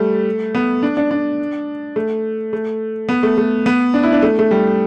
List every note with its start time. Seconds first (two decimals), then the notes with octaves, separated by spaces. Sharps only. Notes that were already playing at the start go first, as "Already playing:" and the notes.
Already playing: G3 A3
0.55 B3
0.83 D4
0.97 D4
1.11 D4
1.96 A3
2.53 A3
3.09 B3
3.23 A3
3.38 A3
3.66 B3
3.94 D4
4.03 E4
4.13 D4
4.22 A3
4.39 A3
4.51 G3